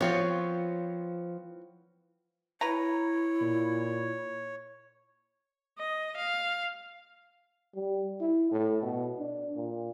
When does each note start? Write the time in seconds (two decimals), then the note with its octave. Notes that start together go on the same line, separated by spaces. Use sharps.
0.01 F3 B3 C4 F4 C#5
2.61 E4 B4 C#5 A#5
3.41 A#2
5.79 D#5
6.17 F5
7.75 G3
8.21 E4
8.51 A2
8.83 B2
9.19 D4
9.56 A#2